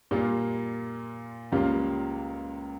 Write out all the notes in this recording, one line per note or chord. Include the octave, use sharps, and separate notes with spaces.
A#2 G3 A#3 F4
C#2 C#3 G3 A#3 F4